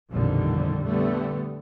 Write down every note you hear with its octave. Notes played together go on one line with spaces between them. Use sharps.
A#1 F2 B2 D3 D#3 G3
D3 G3 A3 B3